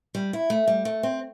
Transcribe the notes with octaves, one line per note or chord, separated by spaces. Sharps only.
G3
E4
A3
G3
A3
C4